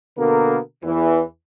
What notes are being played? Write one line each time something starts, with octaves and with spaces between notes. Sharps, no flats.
B2 D3 A#3 B3 A4 A#4
E2 E3